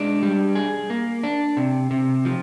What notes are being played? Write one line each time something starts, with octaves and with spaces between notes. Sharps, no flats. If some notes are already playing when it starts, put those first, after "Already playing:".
Already playing: G#3 D4
G3
G#4
A#3
D4
C3
C3
F3